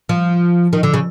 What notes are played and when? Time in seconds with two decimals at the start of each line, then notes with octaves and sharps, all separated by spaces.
0.09 F3
0.73 D#3
0.83 D3
0.94 C#3